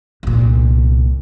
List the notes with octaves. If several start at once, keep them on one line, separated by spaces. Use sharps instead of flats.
C2 A#2